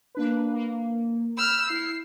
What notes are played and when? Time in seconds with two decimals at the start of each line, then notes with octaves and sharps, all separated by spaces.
0.15 A#3 D4 B4
0.54 A#3
1.37 B5 E6 F6 G6
1.70 E4 C7